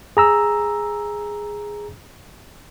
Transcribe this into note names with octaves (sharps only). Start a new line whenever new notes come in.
G#4 A#5 E6